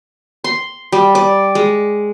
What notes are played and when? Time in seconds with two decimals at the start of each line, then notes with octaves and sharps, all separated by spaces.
0.44 C6
0.92 G3
1.15 D5
1.55 G#3